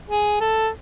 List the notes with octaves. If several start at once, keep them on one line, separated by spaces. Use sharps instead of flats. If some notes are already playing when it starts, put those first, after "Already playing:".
G#4
A4